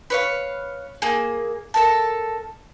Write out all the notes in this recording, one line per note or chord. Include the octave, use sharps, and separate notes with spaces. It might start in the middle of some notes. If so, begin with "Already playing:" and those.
B4 C#5 F5
A#3 G#4
A4 A#4 A5